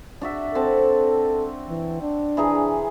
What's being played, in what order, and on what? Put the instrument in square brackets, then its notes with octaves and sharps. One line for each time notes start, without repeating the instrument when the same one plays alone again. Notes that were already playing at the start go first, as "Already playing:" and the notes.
[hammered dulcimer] D4 F#4 E5
[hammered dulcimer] C4 F#4 A5 [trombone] A4
[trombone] E3
D4
[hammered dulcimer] E3 G#4 A#5